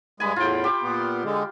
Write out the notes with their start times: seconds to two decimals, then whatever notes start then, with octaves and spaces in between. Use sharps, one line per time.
0.20 G2 G#3 G#5 B5
0.36 E2 A2 F4 G5
0.64 G4
0.82 A#2 B3
1.24 D3 G#3